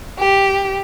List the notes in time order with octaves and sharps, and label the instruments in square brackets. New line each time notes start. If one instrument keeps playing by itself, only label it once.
[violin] G4